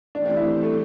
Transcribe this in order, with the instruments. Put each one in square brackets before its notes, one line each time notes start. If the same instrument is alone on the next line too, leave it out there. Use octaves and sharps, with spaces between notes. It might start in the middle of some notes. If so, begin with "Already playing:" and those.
[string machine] E3 A3 C4 G4 [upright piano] D4
[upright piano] D4
E4
A3